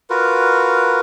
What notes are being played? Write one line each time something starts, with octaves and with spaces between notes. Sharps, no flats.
F4 F#4 A#4 B4